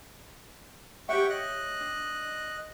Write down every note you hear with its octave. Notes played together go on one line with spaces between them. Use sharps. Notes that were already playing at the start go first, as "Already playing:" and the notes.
G4 C#5 E5 F#5 G5 C#6
D#5 F#6
D4